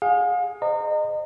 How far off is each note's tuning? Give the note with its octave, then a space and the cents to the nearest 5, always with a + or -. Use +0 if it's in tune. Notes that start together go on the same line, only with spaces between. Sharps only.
G#4 +0 F5 +40
C5 +0 D#5 -30 A#5 -30